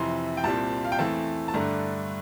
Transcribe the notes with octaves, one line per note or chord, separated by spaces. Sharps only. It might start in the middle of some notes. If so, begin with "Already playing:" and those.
Already playing: F2 C3 E3 C6
G5
C2 A#2 G3 C4 A5
F5
G5
E2 E3 A3 C4 A5
A5
G2 D3 A3 D4 A#5